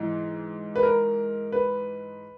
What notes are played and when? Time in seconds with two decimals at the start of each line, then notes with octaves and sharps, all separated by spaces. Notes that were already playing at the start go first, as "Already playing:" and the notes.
Already playing: G#2 E3
0.76 B4
0.83 A#4
1.52 B4